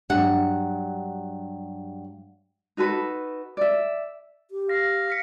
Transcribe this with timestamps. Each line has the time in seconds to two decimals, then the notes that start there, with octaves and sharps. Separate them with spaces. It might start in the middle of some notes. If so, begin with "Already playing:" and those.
0.10 G2 F#3 F#5
2.77 D#4 F#4 A4 B4
3.57 D5 E5
4.51 G4
4.69 F5 A#6
5.08 F6 B6 C#7